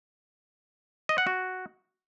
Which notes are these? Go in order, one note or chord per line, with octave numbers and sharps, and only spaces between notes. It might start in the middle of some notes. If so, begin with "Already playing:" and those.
D#5
F#5
F#4